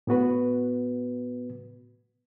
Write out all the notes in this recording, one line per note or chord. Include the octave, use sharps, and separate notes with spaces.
A2 B3 F#4 B4